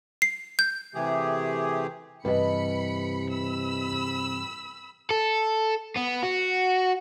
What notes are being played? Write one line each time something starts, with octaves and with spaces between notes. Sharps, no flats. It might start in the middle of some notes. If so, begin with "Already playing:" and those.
C7
G6
C3 E3 A3 G4 G#4
G2 C3 E3 B4 D#5 B5 C#7
B5 E6
A4
B3
F#4